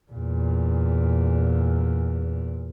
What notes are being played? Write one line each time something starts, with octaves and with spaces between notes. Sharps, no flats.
E2 A#2